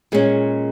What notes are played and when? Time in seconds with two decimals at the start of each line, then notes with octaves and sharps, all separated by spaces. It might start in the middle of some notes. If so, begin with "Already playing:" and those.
0.12 A#2 G#3 C#4